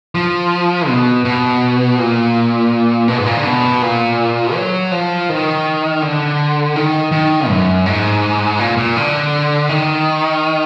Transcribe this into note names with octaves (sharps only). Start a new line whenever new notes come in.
F3
B2
B2
A#2
B2
G#2
A#2
D3
B2
A#2
F#3
F3
D#3
D3
D#3
D#3
F#2
G#2
A#2
A#2
D3
D#3